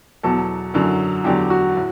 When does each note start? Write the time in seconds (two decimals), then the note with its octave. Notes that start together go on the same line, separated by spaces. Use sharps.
0.23 E2 B2 F#3 A4
0.74 F#2 D3 F#3
1.24 E2 D3 F#3 G4
1.50 F#4
1.76 A2